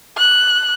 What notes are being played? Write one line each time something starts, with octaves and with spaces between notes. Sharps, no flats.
F#6